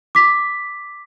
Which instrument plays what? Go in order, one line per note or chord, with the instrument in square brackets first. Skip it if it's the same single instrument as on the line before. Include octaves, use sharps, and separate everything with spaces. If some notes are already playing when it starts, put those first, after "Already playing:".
[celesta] D6 B6